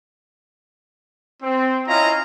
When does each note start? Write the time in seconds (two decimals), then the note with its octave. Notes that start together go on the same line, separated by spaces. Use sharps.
1.43 C4
1.88 C#4 E4 F4 D#5 F5 A#5